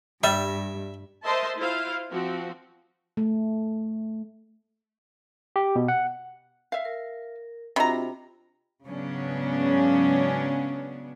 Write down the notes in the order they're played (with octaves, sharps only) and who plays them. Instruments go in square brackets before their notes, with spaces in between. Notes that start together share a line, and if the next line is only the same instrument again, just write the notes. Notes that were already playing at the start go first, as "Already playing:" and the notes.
[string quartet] G2 [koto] G3 [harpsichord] E5
[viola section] A#4 C5 D#5 E5 A5 C6
E4 F4 C5 F5
F3 C4 F#4
[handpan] A3
[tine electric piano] G4
B2
F#5
[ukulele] E5 F5
[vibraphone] A#4
[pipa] C3 A#5 [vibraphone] C4 F4 F#4 [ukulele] D4 D#5 B5
[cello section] G#2 C#3 F#3 B3 C#4 D4